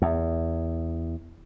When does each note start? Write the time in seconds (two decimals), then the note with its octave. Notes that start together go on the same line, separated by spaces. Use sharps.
0.02 E2